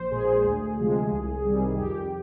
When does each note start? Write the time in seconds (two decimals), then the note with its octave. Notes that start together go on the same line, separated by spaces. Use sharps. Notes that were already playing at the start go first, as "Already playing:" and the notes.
Already playing: A#1 C5
0.11 A#2 G#3 G#4
0.44 D2
0.78 C3 F3 G#3
1.11 C2
1.45 C3 D#3 G3
1.78 F2 G4